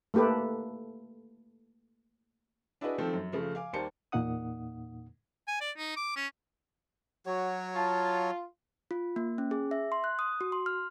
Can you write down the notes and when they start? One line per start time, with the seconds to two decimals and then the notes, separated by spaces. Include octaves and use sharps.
0.14 A3 A#3 G4 A4 B4
2.81 D4 E4 F#4 G#4 B4 D#5
2.98 D#3 F3 A3 C4 A4
3.13 F#2
3.32 C#3 F3 A3
3.55 F5 G#5 D6
3.73 D#2 G3 A#3 C5 A5 C#7
4.12 E2 A#2 A#3 D#4 F#5 D#6
5.48 G#5
5.61 D5
5.78 D#4
5.97 D6
6.16 C#4
7.26 F#3 F#4 C#5
7.76 F4 A5
8.91 F4
9.16 A#3
9.38 C#4
9.51 G#4
9.71 E5
9.92 C6
10.04 F#6
10.19 D#6
10.41 F#4
10.52 C6
10.66 F6